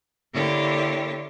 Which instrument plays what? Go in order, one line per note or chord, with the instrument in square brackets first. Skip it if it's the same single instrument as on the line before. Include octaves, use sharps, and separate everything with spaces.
[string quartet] D3 A#3 E4 G4 C#5